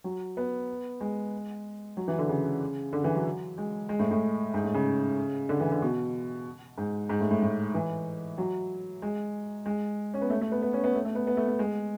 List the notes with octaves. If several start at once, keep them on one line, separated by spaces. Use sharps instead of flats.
F#3
B3
G#3
F#3
E3
D3
C#3
D3
E3
F#3
G#3
G#3
A2
A2
G#2
A2
C#3
D3
E3
D3
B2
G#2
G#2
A2
A2
A2
E3
F#3
G#3
G#3
C#4
B3
A3
A3
B3
B3
C#4
B3
A3
A3
B3
B3
A3
A3
G#3